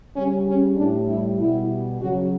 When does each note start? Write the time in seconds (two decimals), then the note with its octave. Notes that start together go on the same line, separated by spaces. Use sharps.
0.14 C#3 G3 C#4
0.46 C#4
0.77 A2 G3 D4
1.07 E4
1.37 B2 G3 E4
1.99 C#3 F#3 F#4